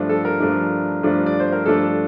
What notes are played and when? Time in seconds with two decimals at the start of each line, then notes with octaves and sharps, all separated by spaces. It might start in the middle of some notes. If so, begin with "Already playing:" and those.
Already playing: G2 F3 A3 D4
0.09 A4
0.25 A#4
0.40 G2 F3 A3 D4
1.03 G2 F3 A3 D4
1.26 D5
1.40 C5
1.52 A#4
1.66 G2 F3 A3 D4 A4